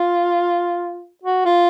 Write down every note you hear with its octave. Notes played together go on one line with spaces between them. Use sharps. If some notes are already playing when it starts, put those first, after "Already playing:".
Already playing: F4
F#4
F4